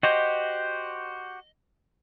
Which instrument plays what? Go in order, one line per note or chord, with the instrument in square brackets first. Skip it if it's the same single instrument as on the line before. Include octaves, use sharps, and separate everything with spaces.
[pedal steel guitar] F#4 G4 C5 [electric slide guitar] D#5